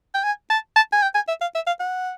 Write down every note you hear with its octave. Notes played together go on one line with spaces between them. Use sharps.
G5
G#5
A5
A5
G#5
G5
G#5
E5
F5
E5
F5
F#5